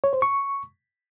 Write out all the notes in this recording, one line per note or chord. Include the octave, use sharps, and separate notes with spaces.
C#5
C5
C#6